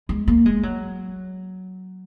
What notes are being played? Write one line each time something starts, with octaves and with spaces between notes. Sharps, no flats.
G#3
A#3
G#3
F#3